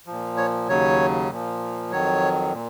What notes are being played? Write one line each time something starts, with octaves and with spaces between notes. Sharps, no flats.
A#2 F3
C#5
D#2 C#3 F#3 C#5
A#2 F3
F2 D#3 F#3 C#5
A#2